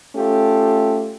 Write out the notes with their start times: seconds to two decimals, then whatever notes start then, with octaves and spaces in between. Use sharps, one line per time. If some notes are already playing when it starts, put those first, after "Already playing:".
0.16 A3 C#4 F4 G4 A4